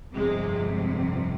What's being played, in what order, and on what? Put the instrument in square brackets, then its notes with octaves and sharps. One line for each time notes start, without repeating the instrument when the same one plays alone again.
[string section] G1 F2 C3 G#3